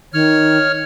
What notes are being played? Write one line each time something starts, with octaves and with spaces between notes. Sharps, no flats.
D#3 C#5 F6